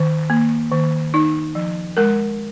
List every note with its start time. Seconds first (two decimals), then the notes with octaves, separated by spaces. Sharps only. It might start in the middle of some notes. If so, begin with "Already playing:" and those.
Already playing: D#3
0.30 A#3
0.71 D#3
1.14 D#4
1.55 F3
1.97 G#3 A#4